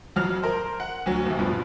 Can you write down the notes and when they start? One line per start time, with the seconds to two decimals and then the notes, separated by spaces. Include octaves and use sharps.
0.16 F2 F#3 F6
0.43 A#4 C5
0.80 F#5
1.06 D2 F#3
1.26 D#2 C3
1.39 G2 B2 F3